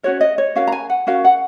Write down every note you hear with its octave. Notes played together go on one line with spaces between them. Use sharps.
C#4 F#4 A#4 C#5
D#5
C#5
C#4 F#4 A#4 F5
A#5
G#5
F#5
C#4 F#4 A#4 F5
F#5